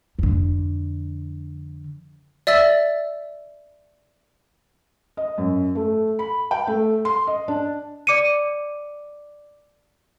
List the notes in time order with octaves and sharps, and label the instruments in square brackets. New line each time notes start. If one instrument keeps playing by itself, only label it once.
[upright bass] F2 D3
[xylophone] D5 E5 E6 A6
[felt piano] D#5
F#2
A3
B5
G5
A3
C6
D#5
D4
[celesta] D5 D6 C#7 D#7